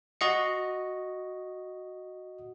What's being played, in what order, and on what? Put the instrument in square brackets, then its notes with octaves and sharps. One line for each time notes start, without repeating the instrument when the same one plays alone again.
[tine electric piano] F#4 D#5 C#7